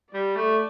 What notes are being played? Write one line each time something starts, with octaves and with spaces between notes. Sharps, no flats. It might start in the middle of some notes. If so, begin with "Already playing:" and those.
G3 D5
A3